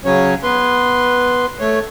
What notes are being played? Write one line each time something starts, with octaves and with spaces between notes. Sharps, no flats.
C#3 F#3 C#4 C#5
B3 B4 C6
A3 C#5